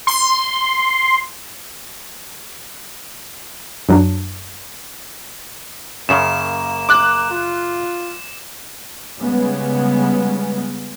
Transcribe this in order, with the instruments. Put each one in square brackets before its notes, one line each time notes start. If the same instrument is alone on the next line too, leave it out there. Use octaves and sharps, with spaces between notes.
[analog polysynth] C6
[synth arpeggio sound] F#2 F#3 D4
[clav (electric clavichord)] F#2 C#3 [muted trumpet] A#3 [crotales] E7
[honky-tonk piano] D6 F#6
[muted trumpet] F4
[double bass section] C#3 G3 G#3 B3